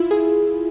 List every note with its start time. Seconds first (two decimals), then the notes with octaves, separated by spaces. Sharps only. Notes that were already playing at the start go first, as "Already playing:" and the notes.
Already playing: E4 F4
0.11 G#4